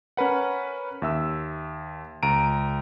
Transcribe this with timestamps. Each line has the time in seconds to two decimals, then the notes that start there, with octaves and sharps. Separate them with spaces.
0.17 C#4 A#4 B4 F#5
1.02 D#2 E5 E6
2.23 C#2 A#5 D7 D#7